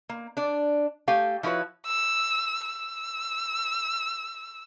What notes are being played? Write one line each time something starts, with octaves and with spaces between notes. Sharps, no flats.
A#3
D4 D5
A3 G4 F5 G#5
F3 E4 F#4 B4 C#5
E6
E6